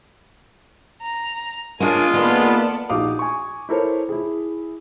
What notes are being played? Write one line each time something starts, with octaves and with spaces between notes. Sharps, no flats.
A#5
G#3 A#3 D4 F4 C#5 G#5
D#3 A#3 B3 A4 D5
A#1 D#4 F#4 F5 D6 D#6
G#5 C#6
E4 A4 A#4 C5 C#5
E4 G#4